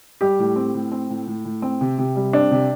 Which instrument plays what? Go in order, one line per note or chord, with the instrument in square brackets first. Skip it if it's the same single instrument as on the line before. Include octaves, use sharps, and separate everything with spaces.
[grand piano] G3 [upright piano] G4
[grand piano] A2
C4
A2
C4
A2
A2
A2
C4
C3
C3
G3
[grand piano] C4 [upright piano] D4
[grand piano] C3